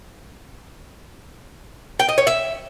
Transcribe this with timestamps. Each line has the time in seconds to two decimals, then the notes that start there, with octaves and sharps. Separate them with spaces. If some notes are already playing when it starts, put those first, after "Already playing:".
2.00 G5
2.09 D#5
2.18 C#5
2.27 E5